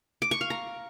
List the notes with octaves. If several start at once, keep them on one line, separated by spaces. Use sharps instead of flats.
D6
C#6
F5
A#5